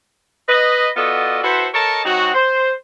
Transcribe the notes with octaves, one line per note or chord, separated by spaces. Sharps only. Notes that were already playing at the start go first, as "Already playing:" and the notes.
B4 D#5
B3 F4 F#4 A4 D5 D#5
E4 F#4 A4 B4 C5
A4 A#4 C#5 D#5 A5
F#3 C4 D#4 F#4
C5